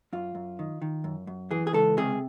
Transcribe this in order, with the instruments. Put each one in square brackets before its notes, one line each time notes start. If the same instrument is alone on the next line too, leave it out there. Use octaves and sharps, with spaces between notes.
[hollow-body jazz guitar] F#2 F4
F#2
D#3
D#3
F#2
F#2
E3 G#4
G#4
C#2 A4
C3 G#4